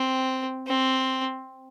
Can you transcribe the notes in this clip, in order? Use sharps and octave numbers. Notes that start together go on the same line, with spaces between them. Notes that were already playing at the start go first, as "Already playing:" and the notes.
Already playing: C4
C4